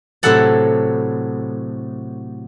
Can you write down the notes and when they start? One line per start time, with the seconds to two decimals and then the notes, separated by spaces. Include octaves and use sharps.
0.23 A2 C3 F#3 A4 F#5 A5